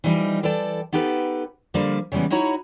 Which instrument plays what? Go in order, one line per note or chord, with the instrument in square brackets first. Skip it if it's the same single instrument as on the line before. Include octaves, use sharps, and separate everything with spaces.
[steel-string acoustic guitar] E3 F3 G3 D4 D#4
E3 A4 D5 G5 A5
B3 D#4 G4 A4 B4
D3 F3 G3 A#3 D5
C#3 E3 G3 G#3 B3
D#4 E4 F#4 C#5 A#5